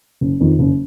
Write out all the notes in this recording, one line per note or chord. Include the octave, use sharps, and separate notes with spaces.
F#1
F2 D#3
F#1